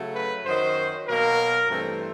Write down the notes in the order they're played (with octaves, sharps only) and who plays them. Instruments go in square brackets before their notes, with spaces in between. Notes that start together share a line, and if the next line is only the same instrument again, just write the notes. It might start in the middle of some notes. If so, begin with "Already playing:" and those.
Already playing: [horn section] C#3 F#3 A3
B4
F#2 D#3 F#3 C5
B2 F#3 A#3 A#4
G2 E3 A3 C4